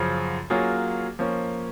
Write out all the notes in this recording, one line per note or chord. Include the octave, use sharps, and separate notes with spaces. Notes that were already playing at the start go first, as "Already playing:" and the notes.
Already playing: F#2 C#3 F3
F#3 A#3 C#4 F4 G#4
F3 A#3 C#4